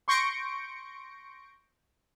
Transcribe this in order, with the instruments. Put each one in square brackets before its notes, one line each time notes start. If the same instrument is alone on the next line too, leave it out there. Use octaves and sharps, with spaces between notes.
[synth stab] C6 C#6 G6 A#6 C#7 D7